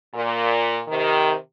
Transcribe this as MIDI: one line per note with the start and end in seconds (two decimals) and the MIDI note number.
0.15 0.80 46
0.88 1.34 48
0.88 1.34 51